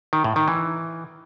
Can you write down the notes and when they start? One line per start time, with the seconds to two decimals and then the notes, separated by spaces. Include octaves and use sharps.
0.13 D#3
0.24 A2
0.36 D#3
0.48 E3